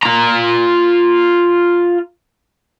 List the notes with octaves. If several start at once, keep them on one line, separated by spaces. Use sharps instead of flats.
F4 A#5